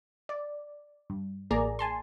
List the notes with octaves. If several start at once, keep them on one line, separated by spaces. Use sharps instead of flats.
D5
G2
A1 A#3 G#4 D5 A#5
G#5 A5 C6